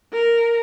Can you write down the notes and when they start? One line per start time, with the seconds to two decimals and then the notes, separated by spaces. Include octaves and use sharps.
0.12 A#4